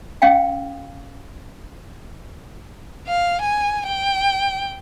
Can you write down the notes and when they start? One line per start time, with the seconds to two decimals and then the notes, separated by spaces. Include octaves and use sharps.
0.22 C#4 F5 G5
3.07 F5
3.41 G#5
3.86 G5